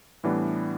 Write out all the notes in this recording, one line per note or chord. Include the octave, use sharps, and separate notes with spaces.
A2 E3 G3 B3 D4